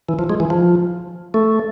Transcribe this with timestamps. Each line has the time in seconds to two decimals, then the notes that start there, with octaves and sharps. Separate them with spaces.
0.09 E3
0.19 F3
0.30 G#3
0.40 E3
0.50 F3
1.34 A3